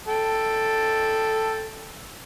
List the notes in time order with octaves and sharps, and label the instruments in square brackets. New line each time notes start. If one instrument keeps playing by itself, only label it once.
[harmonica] A4 G5